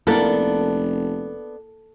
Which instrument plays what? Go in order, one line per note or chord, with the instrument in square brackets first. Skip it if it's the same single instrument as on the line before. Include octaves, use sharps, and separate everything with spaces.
[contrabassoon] F1 [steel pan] A#3 E4 A#4 [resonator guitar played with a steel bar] B3 D4 [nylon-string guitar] A4